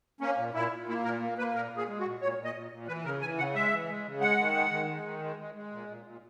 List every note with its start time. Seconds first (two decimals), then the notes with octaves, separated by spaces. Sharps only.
0.21 A#3 C#4
0.38 A#2
0.54 A#2 E4
0.71 A#2
0.89 A#3 E4
1.04 A#2 A#4
1.21 A#3
1.38 A#3 B4
1.54 A#2 A#4
1.72 A#2 G#4
1.87 G#3
2.00 F#4
2.05 A#2
2.21 A#2 C#5
2.39 A#2
2.44 D#5
2.55 A#2
2.72 A#2
2.88 E3 B4
3.04 C#3 A#4
3.21 E3 G#5
3.38 C#3 F#5
3.55 G#3 E5
3.72 E3
3.89 G#3
4.06 C#3
4.21 G#3 F#5
4.39 D#3
4.55 G#3
4.71 D#3
4.88 G#3
5.05 D#3
5.22 G#3
5.39 G#3
5.55 G#3
5.72 A#2
5.88 A#2
6.06 A#2